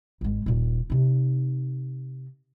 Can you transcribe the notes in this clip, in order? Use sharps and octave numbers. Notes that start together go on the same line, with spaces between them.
G#1 G#3
D#1 A#2
C3 D#4